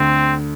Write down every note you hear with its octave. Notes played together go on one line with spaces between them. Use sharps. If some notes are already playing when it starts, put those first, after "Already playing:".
Already playing: D2 D3 C4